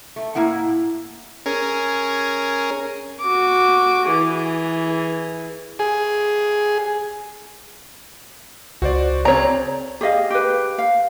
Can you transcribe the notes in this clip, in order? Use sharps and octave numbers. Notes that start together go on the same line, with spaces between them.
A3
A2 A#3 E4 F#5
C#4 G#4 A#4
F#4 D6
E3 G#4
G#4
C#2 F#4 C5 D5
C#3 C4 C#5 D5 A#5
G4 G#4 D#5 F5
G4 B4
F5